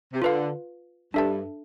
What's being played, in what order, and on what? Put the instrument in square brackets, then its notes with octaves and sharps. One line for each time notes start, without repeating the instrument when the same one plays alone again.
[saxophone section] C3
[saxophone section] D3 [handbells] F4 B4 F5
[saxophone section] G2 [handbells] D4 A4 E5 A5